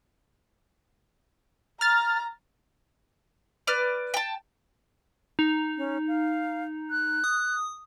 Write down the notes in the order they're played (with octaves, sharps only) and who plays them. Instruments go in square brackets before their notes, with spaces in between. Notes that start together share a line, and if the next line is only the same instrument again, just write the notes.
[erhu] A#5 [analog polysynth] F6 A6
[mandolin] B4 D5 F6
G5 A5
[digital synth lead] D#4
[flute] C#4
F5
F#6
[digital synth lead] D#6